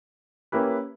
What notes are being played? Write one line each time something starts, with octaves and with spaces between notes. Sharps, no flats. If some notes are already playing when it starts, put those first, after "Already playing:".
A#3 C#4 E4 G4 B4